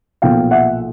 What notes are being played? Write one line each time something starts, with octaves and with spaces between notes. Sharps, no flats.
B1 A#2 F3 F5 G5
E5 F#5